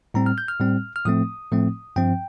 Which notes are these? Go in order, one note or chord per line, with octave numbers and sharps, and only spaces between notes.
A2 G3 C4 A#5
F6
G6
F6
A2 G3 C4
F6
A2 F3 A3 C4 D#6
A2 F3 A3 C4
G2 F3 C4 G5